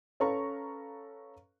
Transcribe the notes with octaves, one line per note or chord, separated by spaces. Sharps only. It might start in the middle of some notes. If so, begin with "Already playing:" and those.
C#4 A4 B4 F5 A#5 C#6